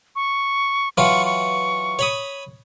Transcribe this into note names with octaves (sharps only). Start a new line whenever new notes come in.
C#6
E3 F#3 F4 C#6
C#6
C#5 B5 D#6